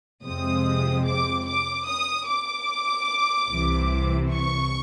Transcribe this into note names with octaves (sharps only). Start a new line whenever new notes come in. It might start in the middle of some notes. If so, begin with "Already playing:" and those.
F2 C3 F3 G#3 C4 D#6
D6
D6
D#6
D6
C2 C3 E3
C#6